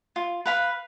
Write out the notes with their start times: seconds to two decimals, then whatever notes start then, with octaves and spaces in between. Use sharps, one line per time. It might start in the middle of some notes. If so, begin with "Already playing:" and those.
0.16 F4
0.46 B4 F5 B5